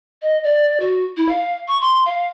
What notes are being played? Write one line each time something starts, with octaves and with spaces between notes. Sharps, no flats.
D#5
D5
F#4
E4
F5
C#6
C6
F5